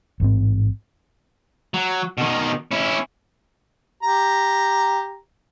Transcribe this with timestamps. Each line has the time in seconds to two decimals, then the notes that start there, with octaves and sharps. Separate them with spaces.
0.20 A1 G#2 C4
1.74 F#3
2.18 B2 D#3
2.71 C#4 E4
4.03 G4 A#5